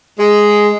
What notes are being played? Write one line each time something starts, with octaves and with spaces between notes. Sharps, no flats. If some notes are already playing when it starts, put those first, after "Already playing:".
G#3